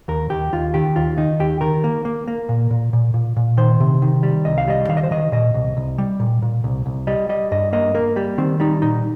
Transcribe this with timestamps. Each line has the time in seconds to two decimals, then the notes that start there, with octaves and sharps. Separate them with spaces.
0.08 D#2 A#4
0.30 D#2 G4
0.53 D#2 F4
0.74 D#3 G4
0.96 D#2 F4
1.18 D#3 D#4
1.40 D#2 G4
1.61 D#3 A#4
1.84 A#3
2.05 A#3
2.28 A#3
2.49 A#2
2.71 A#2
2.93 A#2
3.14 A#2
3.37 A#2
3.57 D#3 C5
3.80 C3
4.02 D#3
4.23 G3
4.45 C2 D#5
4.58 F5
4.68 G3 D#5
4.89 D#3 F5
4.97 D#5
5.03 C5
5.11 D#3 D#5
5.32 A#2 D#5
5.54 C2
5.77 C2
5.98 G3
6.20 A#2
6.42 A#2
6.64 C2
6.86 C2
7.07 G3 D#5
7.29 G3 D#5
7.51 G2 D#5
7.73 A#3 D#5
7.95 A#3 A#4
8.16 G3 G4
8.38 D#3 C4
8.60 G3 D#4
8.82 A#2 D#4